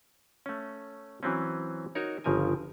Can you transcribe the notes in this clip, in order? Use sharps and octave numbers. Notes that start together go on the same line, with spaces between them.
A3 C#4
E3 F#3 C4 C#4
D#4 F#4 A#4 C#5
G1 C#3 F3 A#4 G#5